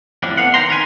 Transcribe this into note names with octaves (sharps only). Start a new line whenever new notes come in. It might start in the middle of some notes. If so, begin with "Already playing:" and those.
F2 A2 D3 G3 D4
B3 D4 F5 F#5
D3 D#3 G4 G5 A#5 C6
D#3 A#4 B4 G#5